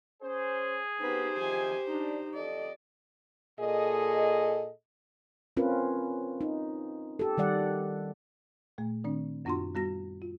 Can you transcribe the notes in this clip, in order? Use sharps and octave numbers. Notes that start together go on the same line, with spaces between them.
C#4 G#4 C5
B3 C4 D#4 G4 B4 C5
C3 D#3 F3 G#5
D4 D#4
F2 A4 D5 D#5
A#2 G#4 A4 D#5
C4 C#4 F4 A#4 B4
D#4
G4 A4
D#3 G3 D5 F#5
A#2 A3
D#3 C4 D4
F#2 B3 D4 F4 F#4 C6
G3 B3 F#4 A#6
F4